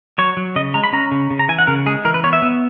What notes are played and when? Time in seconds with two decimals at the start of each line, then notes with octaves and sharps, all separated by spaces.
0.18 F#3 C#5
0.37 F#3
0.56 C#3 D#5
0.74 G#3 A#5
0.84 B5
0.93 C#4 A#5
1.11 C#3
1.31 C#3
1.39 A#5
1.48 E3 G#5
1.59 F#5
1.67 C#3 A#4
1.86 G#3 G#4
2.05 E3 A#4
2.14 B4
2.24 B3 C#5
2.33 E5
2.42 B3